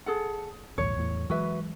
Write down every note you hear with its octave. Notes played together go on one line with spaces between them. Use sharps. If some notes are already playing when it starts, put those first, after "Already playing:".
G#4 A4 F#5
A#1 D#2 G#2 C#5
E2 A2
E3 F#3 G#3 F#4 B4 E5